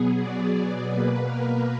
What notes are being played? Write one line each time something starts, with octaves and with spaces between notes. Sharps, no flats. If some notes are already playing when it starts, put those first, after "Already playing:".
Already playing: B2 F#3 B3 G#4
D5
B2 A#3 B4
A#4